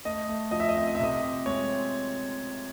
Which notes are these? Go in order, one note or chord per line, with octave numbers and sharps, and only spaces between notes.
A3 D#5
A3
F3 D#5
E5
D#5
C4 E5
D#5
E5
C3 D#5
C4
G#3 C#5
C4